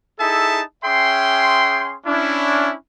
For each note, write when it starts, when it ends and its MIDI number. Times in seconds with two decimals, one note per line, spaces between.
0.19 0.61 63
0.19 0.61 64
0.19 0.61 68
0.19 0.61 69
0.19 0.61 76
0.19 0.61 81
0.84 1.96 61
0.84 1.96 68
0.84 1.96 76
0.84 1.96 79
0.84 1.96 84
2.06 2.74 61
2.06 2.74 62
2.06 2.74 64